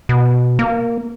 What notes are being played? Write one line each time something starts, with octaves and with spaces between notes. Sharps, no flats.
B2
A#3